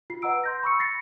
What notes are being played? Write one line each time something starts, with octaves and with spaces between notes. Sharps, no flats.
F4 C7
B4 D#5 F#5 A#5 E6 D7
C6 G6 A#6
B5 C#6 E6 C#7
A6 A#6 C7 C#7